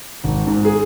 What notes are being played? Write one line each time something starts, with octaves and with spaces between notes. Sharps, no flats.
G#1
G#2
G#4